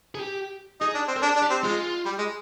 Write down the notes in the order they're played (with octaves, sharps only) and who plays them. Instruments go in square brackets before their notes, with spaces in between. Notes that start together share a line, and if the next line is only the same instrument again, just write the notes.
[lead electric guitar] G#4
G4
[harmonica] D#4 [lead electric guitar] G#4
[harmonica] D4
C4
[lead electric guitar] A#4
[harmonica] D4 [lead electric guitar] G#4
[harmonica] D4
[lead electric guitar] G4
[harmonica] C4
[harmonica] G#3 [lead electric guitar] F4
[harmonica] G3
G#3